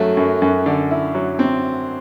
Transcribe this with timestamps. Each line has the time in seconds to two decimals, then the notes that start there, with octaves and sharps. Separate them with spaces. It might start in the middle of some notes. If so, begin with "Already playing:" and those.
Already playing: F#2 F#3 A3
0.17 F#2
0.42 F#2
0.66 D3
0.91 E4
1.15 F#3
1.39 C4